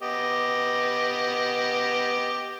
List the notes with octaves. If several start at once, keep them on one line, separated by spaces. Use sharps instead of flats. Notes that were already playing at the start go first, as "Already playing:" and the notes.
B3 G4 D#5